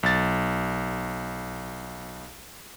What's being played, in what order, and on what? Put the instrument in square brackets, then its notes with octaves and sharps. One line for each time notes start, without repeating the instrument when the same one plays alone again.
[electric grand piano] B1 A6